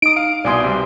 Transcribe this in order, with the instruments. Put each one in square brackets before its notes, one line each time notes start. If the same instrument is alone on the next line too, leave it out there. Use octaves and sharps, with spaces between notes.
[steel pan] D#4 D#6 [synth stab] D7
[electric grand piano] F5
[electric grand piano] C2 B2 D#6 [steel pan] D5 G#5 C6
[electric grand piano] C3 G3